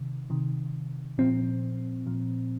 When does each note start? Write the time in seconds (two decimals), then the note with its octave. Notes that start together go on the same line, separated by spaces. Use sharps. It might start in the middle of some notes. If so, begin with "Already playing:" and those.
Already playing: C3 D#3
0.30 C3 D#3
1.18 A#2 F3 C4
2.06 A#2 F3